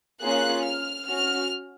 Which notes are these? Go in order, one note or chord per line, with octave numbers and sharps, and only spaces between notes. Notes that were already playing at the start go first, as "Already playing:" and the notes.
A#3 C#4 F4 G#4 F#6
F6
C#4 F#4 F6